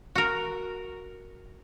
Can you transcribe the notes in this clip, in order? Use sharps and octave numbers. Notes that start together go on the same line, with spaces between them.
F#4 A#4